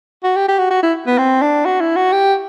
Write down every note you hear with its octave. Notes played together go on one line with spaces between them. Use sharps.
F#4
G4
G4
F#4
F#4
E4
B3
C4
D4
F#4
E4
F#4
G4